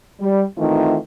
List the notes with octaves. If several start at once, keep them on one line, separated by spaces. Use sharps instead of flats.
G3
D#3 E3 A3 C4 D#4 F4